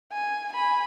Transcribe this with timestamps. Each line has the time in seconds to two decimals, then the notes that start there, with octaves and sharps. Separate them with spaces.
0.12 G#5
0.53 G#5 B5